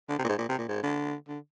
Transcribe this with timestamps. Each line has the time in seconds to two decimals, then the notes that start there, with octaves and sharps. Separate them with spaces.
0.09 D3
0.19 C3
0.24 A#2
0.28 G#2
0.38 A#2
0.49 C3
0.58 A#2
0.68 G#2
0.83 D3
1.28 D3